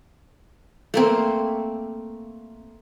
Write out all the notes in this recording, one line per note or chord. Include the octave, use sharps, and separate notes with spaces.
A3 A#3 C4